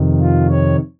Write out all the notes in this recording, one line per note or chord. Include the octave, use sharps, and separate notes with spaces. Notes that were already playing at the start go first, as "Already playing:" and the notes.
Already playing: F2 C3 D#3
F4
C#5